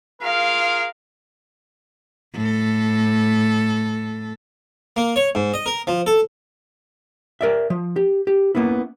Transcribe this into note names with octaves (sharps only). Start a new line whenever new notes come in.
F4 G#4 A#4 F5
A2 A4
A#3
C#5
G#2
D#5
A#4
F3
A4
A#4 D5 E5
F3
G4
G4
A#3 B3 C#4 E4